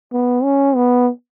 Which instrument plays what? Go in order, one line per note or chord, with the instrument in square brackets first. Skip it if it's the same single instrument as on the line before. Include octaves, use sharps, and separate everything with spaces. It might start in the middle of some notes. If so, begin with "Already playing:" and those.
[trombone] B3
C#4
B3